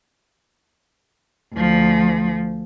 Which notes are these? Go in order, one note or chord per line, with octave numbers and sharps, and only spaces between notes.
D2 F3